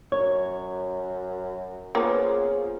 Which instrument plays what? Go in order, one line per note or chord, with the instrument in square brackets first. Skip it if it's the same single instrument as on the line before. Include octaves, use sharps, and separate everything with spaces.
[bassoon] F#2 [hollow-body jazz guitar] C#5
[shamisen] A#3 B3 [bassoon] C#4 [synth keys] F4 G#4 C5